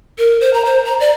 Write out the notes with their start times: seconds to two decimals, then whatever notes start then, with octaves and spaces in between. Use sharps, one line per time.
0.18 A#4
0.41 C5
0.54 A#5
0.65 C5
0.85 A#5
1.00 D5